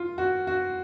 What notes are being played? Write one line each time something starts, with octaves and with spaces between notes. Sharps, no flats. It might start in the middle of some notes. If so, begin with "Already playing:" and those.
Already playing: F4
F#4
F#4